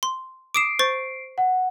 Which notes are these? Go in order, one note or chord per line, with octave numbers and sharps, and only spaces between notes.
C6
D6 D#6 C7 D7 E7
C5 C#6 A6
F#5